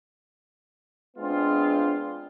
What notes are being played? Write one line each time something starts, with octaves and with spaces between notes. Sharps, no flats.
G#3 B3 C4 D4 F4